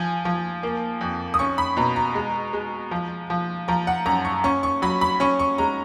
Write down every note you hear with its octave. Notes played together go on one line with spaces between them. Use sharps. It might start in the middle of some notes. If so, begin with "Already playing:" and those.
Already playing: F3 G#5
F3
A#3
F2
D#6
C#4 C#6
B5
B2 A#5
A#5
G#3
G#3
F3
F3
F3 A#5
F#5
F#2 A#5
C#6
C#4 C#6
C#6
F#3 B5
B5
C#4 C#6
C#6
G#3 A#5